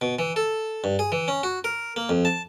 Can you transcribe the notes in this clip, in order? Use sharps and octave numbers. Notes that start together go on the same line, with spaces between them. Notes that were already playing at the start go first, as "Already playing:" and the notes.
B2
E3
A4
G2
G#4
E3
C#4
F#4
A#4
A#3
F2
A5